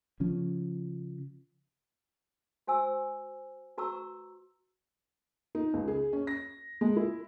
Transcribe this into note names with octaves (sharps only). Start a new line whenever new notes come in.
C#3 F3 C#4
F#4 C5 G#5 E6
F#4 B4 A#5 C#6 E6
D#4
C#2
G#4
C#4
A#6
G#3
E4